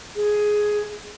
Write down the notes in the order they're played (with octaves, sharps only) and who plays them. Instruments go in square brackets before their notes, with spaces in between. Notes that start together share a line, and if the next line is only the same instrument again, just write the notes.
[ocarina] G#4